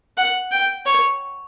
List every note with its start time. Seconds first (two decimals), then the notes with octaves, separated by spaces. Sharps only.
0.17 F#5
0.52 G5
0.86 C#5